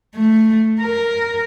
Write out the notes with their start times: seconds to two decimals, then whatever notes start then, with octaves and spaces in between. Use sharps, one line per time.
0.15 A3
0.81 A#4